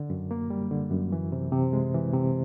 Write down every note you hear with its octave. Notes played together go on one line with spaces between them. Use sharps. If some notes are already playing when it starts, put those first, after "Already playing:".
Already playing: D3
F#2
A#3
G3
D3
F#2
E3
C3
C3
G#3
E3
C3